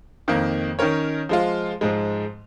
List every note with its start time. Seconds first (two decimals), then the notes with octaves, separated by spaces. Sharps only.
0.28 F2 D#3 A#3
0.79 D#3 C#4 A#4 C#5
1.29 F3 G#3 F4
1.81 G#2 F3 G#3